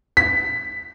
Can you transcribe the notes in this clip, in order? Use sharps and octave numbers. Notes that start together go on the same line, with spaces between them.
B6